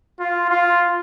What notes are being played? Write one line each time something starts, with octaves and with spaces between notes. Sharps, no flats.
F4
F4